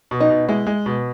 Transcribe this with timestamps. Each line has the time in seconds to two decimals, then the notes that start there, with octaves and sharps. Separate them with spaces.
0.11 B2
0.20 D#4
0.30 B2
0.49 G#3 E4
0.67 G#3
0.86 B2